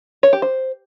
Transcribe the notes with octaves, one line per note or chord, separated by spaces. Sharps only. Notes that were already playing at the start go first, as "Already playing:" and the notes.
C#5
G4
C5